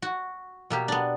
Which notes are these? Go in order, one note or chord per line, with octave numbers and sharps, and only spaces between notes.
F#4
B2 A#3 G4
B3 D4